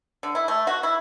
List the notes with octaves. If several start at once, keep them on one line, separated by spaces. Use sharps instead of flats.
D3
E4
A3
F#4
E4